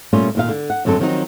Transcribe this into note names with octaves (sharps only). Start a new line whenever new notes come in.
A#2 G3 A3 A#3 C#4 F4
D#2 A#2 F5
D3
F#5
F#2 D3 F#3 C4 A4
D#3 F3 F#3 C4 D4 D#4